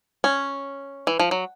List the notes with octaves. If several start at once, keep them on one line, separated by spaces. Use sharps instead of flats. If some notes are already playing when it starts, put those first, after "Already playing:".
C#4
E3
F3
F#3